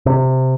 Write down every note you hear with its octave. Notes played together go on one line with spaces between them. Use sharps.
C3